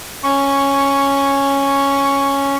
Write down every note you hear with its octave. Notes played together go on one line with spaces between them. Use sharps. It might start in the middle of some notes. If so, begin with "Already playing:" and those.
C#4 C#6